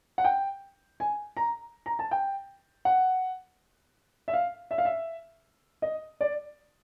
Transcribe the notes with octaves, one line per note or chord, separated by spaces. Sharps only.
F#5
G5
G#5
A#5
A#5
A5
G5
F#5
E5
F5
E5
F5
E5
D#5
D5